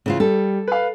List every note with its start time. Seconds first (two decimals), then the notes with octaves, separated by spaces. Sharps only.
0.06 C#3 E3 F4
0.20 G3 A4
0.68 B4 F5